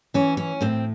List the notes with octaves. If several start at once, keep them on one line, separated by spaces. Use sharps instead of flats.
E3 C#4
C#4
A2 C4